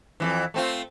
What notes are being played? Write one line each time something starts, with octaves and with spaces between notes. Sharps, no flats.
F2 B2 E3
A3 C4 F4